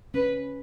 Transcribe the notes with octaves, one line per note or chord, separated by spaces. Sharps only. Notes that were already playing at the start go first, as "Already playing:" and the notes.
C#4 B4